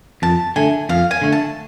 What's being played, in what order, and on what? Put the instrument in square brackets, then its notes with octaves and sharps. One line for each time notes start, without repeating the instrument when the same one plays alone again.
[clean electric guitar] F2 [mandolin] A5
[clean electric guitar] D3 A3 [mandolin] G#5
[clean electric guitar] F2 [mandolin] F5
[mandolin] G#5
[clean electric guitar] D3 A3
[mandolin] A5